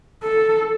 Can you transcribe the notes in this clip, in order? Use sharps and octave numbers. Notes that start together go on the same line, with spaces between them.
A4